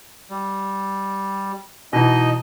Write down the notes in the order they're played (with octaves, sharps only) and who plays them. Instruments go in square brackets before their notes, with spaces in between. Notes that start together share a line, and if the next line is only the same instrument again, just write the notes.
[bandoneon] G3
[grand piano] B2 E3 [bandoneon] D#4 D#5